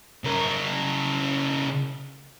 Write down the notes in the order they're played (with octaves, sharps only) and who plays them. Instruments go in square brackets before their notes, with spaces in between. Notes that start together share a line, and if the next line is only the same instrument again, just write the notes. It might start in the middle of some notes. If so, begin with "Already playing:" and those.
[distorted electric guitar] C#3 A#4